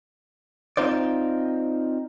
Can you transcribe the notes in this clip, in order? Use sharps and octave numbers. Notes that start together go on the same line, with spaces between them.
C4 D#4 F4 C5 D5